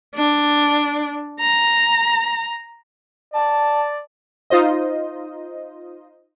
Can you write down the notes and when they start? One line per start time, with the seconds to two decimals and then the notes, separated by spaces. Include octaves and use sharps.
0.15 D4
1.40 A#5
3.34 D5 A5
4.50 D#4 F4 C5 D#5